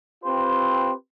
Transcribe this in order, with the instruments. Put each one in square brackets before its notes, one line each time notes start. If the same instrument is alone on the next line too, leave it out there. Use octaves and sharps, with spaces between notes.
[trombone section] C4 F4 G4 B4 C5